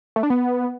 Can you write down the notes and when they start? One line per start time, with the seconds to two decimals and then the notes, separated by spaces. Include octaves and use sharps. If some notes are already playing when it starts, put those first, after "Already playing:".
0.16 A3
0.23 D4
0.30 B3